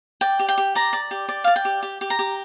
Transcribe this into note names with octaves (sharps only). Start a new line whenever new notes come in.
D5 G5
G4
G5
G4
D5 A#5
D5
G4
D5
D5 F5
G5
G4
G4
G4
A#5
G4